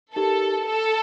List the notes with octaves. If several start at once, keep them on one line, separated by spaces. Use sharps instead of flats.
D#4 G4 A4 A#4
A4